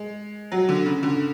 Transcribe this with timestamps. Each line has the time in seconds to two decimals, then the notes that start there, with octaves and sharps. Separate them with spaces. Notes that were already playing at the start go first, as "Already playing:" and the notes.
Already playing: G#3
0.52 F#3
0.69 D3
0.86 C#3
1.03 D3